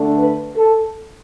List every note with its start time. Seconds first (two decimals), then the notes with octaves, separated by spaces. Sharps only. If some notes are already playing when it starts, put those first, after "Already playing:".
Already playing: D3 A3 D4
0.17 B4
0.56 A4